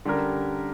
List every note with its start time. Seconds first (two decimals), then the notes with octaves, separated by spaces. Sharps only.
0.05 D3 G3 C#4 G4 A#4